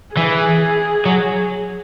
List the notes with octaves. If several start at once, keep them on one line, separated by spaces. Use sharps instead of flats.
E3 G#4
F#3